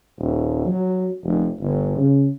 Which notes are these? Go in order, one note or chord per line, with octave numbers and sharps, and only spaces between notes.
D#1
F#3
F1
G1
C#3